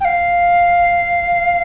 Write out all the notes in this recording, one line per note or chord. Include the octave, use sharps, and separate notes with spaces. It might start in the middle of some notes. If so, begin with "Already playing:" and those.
G5
F5